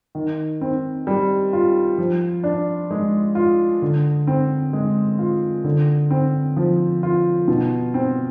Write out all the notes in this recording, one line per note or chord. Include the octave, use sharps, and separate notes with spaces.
D#3
C4
G3
F4
F3
D4
G#3
F4
D3
C4
G#3
F4
D3
C4
F3
F4
B2
C4